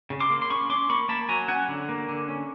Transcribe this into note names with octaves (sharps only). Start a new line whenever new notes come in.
C#3
C6 D6
A#3
C6
C#4 B5 C#6
C#4 C6 D6
A#3 B5 C#6
A#3 A5 B5
F#3 G#5 A#5
C#4 F#5 G#5
D3
A#3
D3
C#4